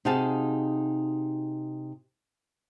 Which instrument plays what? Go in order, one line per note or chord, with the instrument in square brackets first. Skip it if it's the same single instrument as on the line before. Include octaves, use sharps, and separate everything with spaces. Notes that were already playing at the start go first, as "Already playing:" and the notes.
[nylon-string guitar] C3 D#4 F#4 G#4 F5 A5